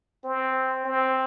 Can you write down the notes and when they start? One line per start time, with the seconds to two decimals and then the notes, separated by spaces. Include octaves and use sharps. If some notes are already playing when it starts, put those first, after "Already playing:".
0.24 C4
0.85 C4